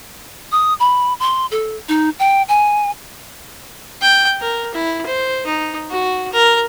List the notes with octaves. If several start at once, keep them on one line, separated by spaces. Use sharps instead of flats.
D#6
B5
C6
A4
D#4
G5
G#5
G5
A#4
E4
C5
D#4
F#4
A#4